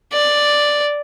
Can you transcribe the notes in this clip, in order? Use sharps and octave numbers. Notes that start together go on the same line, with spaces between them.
D5